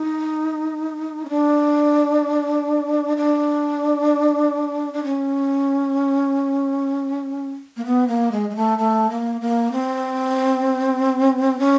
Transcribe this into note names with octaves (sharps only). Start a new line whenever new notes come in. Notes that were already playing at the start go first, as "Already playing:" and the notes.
Already playing: D#4
C#4
D4
D4
D4
C#4
A#3
B3
A#3
G#3
G#3
A3
A3
A#3
A#3
C4
C#4